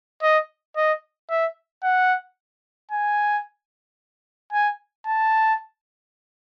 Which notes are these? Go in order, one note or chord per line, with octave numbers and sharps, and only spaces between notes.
D#5
D#5
E5
F#5
G#5
G#5
A5